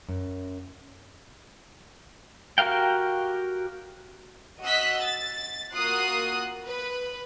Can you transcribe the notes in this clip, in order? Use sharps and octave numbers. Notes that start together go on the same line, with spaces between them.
F#2
F#4 G4 A#4 F5 G5
F#4 D#5 E6 F#6 B6
A6
A#3 F4 F#4 D#6 F#6 C7
B4